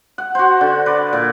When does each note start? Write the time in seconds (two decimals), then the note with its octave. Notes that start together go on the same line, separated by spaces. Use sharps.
0.18 F#5
0.35 F#4 C5
0.61 D3
0.86 B4 D5
1.13 A#2